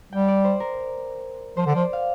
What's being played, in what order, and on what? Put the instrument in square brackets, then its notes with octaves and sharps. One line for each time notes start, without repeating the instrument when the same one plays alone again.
[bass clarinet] G3 [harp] G5
[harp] D5
C5
A#4
[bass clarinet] F3 [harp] C5
[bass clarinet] D3
[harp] D5
[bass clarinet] F3
[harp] F5